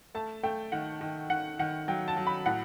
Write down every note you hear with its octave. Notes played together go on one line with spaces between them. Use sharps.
A3 A5
A3 G5
D#3 F#5
D#3
D#3 F#5
D#3 F#5
F#3 G5
A5
F#3
B5
A2 F#5